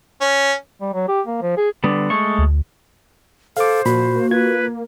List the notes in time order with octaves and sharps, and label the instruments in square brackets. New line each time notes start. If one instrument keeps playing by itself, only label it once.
[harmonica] C#4
[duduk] G3
F#3
G4
A#3
F3
G#4
[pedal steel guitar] D3 G3 B3
G#3 A3 C#6
[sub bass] D2
[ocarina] A4 [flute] C5 [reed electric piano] F5 D6
[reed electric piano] A#2 B5 [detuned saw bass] F3 [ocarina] F#4
[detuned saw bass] A#3
[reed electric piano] F4 G#6 [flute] B4